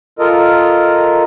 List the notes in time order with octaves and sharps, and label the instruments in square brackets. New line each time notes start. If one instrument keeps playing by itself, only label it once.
[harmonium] F4 A4 A#4 D#5